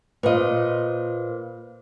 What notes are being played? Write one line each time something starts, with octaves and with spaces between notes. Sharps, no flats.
A#2 B4 C5 D#5 F5